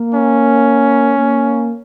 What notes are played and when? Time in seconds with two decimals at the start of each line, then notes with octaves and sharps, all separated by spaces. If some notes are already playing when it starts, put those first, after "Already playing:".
Already playing: A#3
0.14 C#4
1.17 A#3